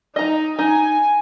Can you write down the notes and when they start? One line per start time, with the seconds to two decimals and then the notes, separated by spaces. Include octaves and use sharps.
0.16 D#4 D#5 A#5
0.59 D#4 G#5